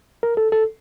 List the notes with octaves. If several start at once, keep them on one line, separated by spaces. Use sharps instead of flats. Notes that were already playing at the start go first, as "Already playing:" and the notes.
A#4
A4
A4